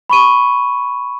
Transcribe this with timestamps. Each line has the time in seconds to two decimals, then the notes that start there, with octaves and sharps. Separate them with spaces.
0.10 B5 C#6 D#7